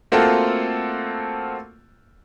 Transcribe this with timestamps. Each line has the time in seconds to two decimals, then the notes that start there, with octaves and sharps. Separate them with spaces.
0.12 A3 A#3 C4 F4 F#4 A4